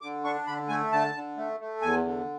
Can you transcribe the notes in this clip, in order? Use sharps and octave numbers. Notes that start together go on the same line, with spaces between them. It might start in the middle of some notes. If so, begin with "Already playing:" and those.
D3 D6
D4 C#6
D3 B5
A3 G#5
D3 A5
D3
A3
A3
E2 G#5
D3